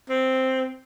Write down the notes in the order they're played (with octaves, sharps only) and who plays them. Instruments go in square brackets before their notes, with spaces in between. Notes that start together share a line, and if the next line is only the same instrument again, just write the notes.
[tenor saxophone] C4